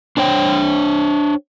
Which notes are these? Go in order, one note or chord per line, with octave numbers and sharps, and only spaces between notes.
D4 C5 C#5 G5